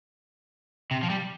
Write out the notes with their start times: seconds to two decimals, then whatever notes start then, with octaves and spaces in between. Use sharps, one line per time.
0.91 C3
1.03 F3
1.10 G3